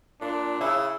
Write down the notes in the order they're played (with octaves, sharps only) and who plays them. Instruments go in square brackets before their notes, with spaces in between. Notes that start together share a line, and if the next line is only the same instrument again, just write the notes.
[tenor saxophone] A#2 [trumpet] D4
[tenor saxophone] C#3 [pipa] E4